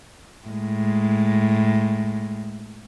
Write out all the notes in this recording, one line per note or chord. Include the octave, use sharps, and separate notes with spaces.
A2 G#3